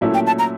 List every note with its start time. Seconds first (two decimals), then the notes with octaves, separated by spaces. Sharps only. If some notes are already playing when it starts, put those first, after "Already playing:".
0.01 A#2 F#3 A3 C#4 E4
0.14 G5
0.27 A5
0.39 A#5